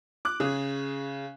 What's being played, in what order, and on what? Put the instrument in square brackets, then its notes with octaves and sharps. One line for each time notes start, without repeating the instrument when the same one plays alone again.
[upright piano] D6 F#6
[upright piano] C#3 [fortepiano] G#4